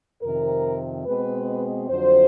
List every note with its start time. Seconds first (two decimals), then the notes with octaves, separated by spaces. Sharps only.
0.22 F2 C3 D#3 A#4
1.06 B2 G#3 C4 B4
1.89 F2 D3 F#3 C5